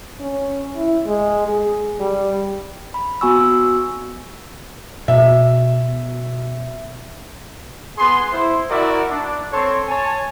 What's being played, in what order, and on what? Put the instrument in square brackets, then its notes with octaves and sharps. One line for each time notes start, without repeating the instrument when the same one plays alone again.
[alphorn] C#4
E4
G#3
G#4
G3
[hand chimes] B5
B3 F#4 G#5 C#6 E6
[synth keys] B2 [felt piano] E5
[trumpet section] B3 G#4 C6
E4 C5
E4 F#4 A#4 D5 E5
D4
C4 A4 C#5 A5 C6
C#5 G#5 A5